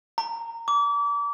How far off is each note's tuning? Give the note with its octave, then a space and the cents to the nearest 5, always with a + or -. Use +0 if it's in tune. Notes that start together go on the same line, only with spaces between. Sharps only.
A#5 -20
D6 -30